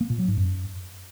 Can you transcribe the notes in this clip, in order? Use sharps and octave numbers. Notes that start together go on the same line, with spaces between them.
A#3
A#2
F#3
G#2
F#2